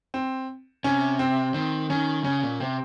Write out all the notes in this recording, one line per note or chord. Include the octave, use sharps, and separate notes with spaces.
C4
C3 C#4
C4
D#3 C4
D#3 C#4
C#3 C#4
A#2
C3 C4